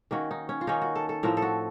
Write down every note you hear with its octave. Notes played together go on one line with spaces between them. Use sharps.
D#3 A#3 C#4 F#4
D#4
C#4
F4
D#3 A#3 C#4 D#4
F#4
A4
A4
A2 F3 C4 A#4
A4
F#4